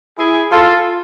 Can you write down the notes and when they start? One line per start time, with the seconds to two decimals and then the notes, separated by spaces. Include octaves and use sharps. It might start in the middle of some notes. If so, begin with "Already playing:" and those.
0.18 E4 G#4
0.52 F4 A4